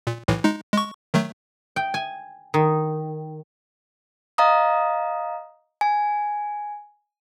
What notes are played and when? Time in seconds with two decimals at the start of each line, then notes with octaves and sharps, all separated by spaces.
0.07 A#2
0.28 B1 A2 E3
0.44 G#3 D#4
0.74 G#3 C#6
1.14 D#3 F#3 A3
1.76 G5
1.94 G#5
2.54 D#3
4.38 D#5 F5 A#5 D#6
5.81 G#5